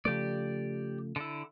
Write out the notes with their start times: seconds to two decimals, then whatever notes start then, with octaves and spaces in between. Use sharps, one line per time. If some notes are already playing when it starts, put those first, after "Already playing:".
0.05 C#3 F3 A3 G4 D5
1.16 D3 E4